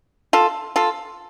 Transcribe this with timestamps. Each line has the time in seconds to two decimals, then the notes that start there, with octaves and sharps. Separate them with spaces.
0.33 F4 A4
0.76 F4 A4